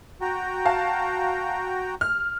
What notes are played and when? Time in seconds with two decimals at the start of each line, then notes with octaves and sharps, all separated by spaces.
0.21 F#4 G5 A#5
0.66 F5 A5
2.01 F6